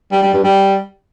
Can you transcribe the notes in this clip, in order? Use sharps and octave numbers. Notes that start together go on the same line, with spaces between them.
G3
G3
G2
G3